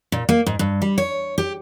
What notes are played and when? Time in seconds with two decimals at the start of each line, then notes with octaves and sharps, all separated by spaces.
0.12 A#2
0.29 A#3
0.46 G#2
0.59 G2
0.82 G3
0.98 C#5
1.38 G4